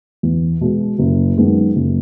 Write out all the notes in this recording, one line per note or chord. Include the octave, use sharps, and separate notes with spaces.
E2
B2 G#3
F#1
F#2 D#3 G#3 B3
F#1